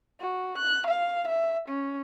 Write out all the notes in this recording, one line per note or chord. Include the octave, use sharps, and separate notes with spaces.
F#4
F#6
F5
E5
C#4